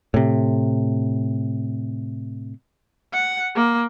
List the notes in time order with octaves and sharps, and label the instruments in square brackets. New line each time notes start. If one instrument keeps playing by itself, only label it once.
[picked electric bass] A2 C3
[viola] F#5
A#3